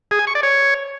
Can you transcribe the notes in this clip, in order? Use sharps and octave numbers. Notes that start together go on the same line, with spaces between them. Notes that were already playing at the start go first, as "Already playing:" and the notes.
G#4
G#5
C#6
D5
C#5